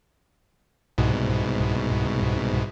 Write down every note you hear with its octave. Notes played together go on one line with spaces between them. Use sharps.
C2 G#2 B2